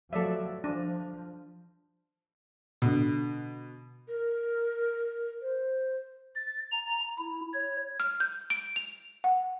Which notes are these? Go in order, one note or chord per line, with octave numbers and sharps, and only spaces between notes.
F3 F#3 A3 A4 D5 E5
F3 D4
B2 D3
A#4
C5
A6
A#5
E4
C#5
F6
G6
D7
F7
F#5